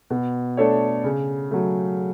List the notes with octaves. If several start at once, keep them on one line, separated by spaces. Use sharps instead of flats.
B2
A3 D4 A4 C#5
C#3
F#3 A3